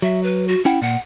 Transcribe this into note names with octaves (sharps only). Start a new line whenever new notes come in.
F#3 E5
B4
F#4
C#4 E4 F#5 G5
A#2 F#5